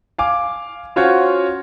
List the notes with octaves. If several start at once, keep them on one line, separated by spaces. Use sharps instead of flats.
F5 G#5 D6
C#4 F4 F#4 C5 C#5